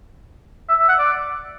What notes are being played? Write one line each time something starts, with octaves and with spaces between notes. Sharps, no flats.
E5
E5
F#5
D5